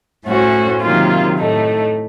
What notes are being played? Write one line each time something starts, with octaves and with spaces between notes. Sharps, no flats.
A2 A3 C#4 F#4 C5
C3 D#3 F#3 A#3 F4
A2 A3 D#4